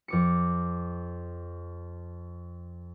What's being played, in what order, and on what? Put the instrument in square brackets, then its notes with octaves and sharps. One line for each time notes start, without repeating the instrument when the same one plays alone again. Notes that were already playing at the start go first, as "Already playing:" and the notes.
[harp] F2 D6 C#7